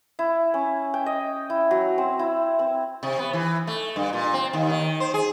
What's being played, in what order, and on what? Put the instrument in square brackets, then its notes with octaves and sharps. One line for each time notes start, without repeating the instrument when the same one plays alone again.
[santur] E4
C#4
G5
D#5
E4
F#3
C4
E4
C4
[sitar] C3
B3
E3
A3
G2
A#2
C4
D#2
D#3
C5
G#4